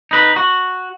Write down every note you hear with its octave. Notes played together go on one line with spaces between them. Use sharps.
D#4 B4
F#4